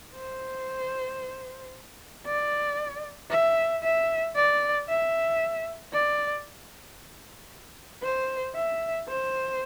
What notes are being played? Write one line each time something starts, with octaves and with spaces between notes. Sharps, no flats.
C5
D5
E5
E5
D5
E5
D5
C5
E5
C5